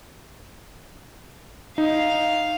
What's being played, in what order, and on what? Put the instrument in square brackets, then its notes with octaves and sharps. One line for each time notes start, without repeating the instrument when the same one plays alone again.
[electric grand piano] D#4 [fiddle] F5